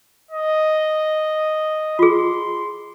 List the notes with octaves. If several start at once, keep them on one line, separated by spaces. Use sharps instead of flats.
D#5
F4 G#4 C6